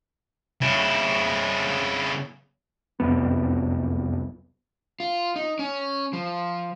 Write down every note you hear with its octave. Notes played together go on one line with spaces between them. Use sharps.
C#3 E4
F#1 C2 F2 B3
F4
D#4
C#4
F3